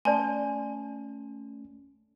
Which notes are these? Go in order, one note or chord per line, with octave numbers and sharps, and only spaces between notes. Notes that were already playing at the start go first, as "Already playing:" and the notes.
A3 C#4 D5 G#5 A5 C6